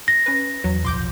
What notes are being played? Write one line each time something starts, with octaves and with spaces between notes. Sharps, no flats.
A#6
C#4 B4
E2 F#3
D1 B1 F3 C6 D6 G6